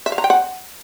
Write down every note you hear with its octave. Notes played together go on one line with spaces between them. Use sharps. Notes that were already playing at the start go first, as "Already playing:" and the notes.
E5
F5
A#5
G5
F#5